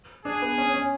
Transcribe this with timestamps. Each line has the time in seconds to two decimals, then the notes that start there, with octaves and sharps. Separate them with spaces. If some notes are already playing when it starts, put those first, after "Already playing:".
0.25 D4 G#4
0.42 B3
0.58 C#4
0.74 C#4